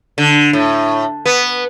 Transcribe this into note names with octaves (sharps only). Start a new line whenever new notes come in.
D3
A2
B3